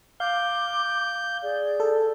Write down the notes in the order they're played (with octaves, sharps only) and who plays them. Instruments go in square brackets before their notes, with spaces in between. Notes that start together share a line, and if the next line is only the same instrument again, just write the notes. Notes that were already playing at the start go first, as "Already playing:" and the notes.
[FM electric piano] F5 [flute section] D6 [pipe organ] G6
[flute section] G#4 D5
[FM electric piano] A4